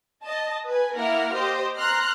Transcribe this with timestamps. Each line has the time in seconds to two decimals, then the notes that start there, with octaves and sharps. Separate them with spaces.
0.24 D#5 A5
0.67 B4 G#5
0.96 A#3 E4 A#4 F#5 F6
1.34 G4 C5 D#5
1.78 A#5 C6 F6 F#6 C7